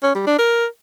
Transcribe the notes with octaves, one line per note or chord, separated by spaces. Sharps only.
C#4
G3
D4
A#4